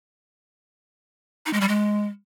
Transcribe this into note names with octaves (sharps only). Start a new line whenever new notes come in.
D#4
G#3
G3
G#3